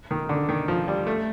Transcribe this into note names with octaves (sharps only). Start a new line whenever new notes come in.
D#3
D3
D#3
F3
G3
A3